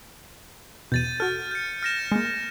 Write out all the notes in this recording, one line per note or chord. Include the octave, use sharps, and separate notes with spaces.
E2 B2 G6 A6 D#7
F#4 A4 F6
G6 C#7
F6 A#6 E7
G#3 A#3